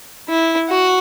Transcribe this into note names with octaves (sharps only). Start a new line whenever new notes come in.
E4
F#4